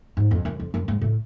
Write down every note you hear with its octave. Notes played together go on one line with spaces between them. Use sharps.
G#2
F2
F#2
F2
F#2
G#2
A2